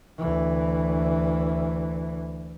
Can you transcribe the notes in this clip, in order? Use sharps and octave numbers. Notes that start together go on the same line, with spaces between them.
D2 E3